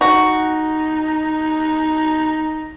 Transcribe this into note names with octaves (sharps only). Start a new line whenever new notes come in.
D#4 F#4